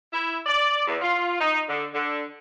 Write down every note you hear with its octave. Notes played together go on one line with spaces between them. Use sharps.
E4
D5
E2
F4
D#4
D3
D3